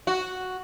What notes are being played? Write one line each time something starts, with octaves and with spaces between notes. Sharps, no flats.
F#4